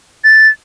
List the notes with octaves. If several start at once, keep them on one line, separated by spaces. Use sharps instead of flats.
A6